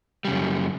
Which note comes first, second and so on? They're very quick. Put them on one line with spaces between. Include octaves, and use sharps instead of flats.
G3 C#3 F#2